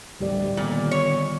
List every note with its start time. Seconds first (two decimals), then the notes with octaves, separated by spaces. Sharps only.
0.20 A1 D2 A2 G3 G4 D5
0.57 A#2 D3 D#3 B3
0.91 C#5